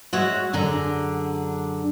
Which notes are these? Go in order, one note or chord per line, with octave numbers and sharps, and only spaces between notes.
G#3 F#4 C#5 E5 F#5
F#2 D3 D4 G#4 A#5